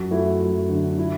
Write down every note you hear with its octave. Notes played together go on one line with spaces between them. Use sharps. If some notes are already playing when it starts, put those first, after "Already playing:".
Already playing: F#2 F#4
A3 E4
F#2
D3
E4